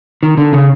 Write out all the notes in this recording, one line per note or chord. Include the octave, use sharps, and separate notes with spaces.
D#3
D3
C#3